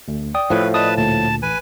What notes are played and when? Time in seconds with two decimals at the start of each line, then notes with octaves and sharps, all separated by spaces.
0.08 D2
0.34 D5 G5 D#6
0.50 A2 F3 B4
0.74 B4 D5 D#5 A5 D#6
0.97 D2 A#2 A5
1.43 A1 B4 G#5